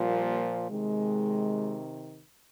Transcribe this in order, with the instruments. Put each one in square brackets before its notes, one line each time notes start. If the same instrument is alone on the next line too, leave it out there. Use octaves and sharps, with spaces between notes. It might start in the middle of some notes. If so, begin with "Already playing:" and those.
Already playing: [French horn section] A#2 F3 G3 A#3
C3 D#3 G#3